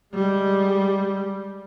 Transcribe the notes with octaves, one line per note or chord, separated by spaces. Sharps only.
G3 G#3